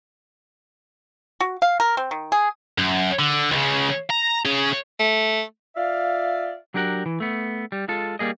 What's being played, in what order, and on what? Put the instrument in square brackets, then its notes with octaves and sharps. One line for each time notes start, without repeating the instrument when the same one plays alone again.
[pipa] F#4
F5
A#4
C4
D#3
G#4
[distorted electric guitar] F#2
D3
C#2 C#3
A#5
C#4 G#4
[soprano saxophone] A3
[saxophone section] F4 D5 E5 F5
[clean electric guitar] F#3 D4 G4 A#4 F#5
E3
A3 B3
G3
G#3 F4 A4
G3 A#3 G#4 D#5